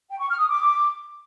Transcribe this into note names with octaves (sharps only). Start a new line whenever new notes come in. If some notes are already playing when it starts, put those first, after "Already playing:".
G5
C#6
F6
D#6
D6